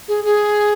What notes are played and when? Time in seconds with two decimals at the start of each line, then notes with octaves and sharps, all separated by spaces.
0.08 G#4
0.24 G#4